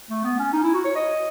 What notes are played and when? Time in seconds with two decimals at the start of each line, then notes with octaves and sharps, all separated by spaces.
0.10 A3
0.24 B3
0.39 C#4
0.53 D#4
0.63 E4
0.74 F#4
0.85 C#5
0.95 D#5